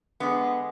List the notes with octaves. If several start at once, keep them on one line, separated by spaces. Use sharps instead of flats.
D3 G#3 B3